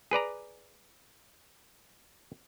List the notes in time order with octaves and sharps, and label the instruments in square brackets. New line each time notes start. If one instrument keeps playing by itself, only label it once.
[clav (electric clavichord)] G#4 B4 D5 A#5